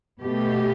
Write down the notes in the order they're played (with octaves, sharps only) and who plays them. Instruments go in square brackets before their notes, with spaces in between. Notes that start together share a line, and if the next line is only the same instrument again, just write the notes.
[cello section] B2 A3 G4